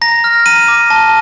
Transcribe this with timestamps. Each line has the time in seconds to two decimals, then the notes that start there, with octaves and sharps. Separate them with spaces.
0.01 A#5 A#6
0.24 F6
0.46 A#5 D#7
0.68 D6
0.90 A5